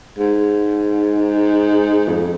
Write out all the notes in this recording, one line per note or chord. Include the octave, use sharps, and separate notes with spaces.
G#2
F2